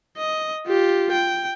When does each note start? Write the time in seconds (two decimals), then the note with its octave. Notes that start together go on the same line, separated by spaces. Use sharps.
0.17 D#5
0.67 F4 G4
1.12 G5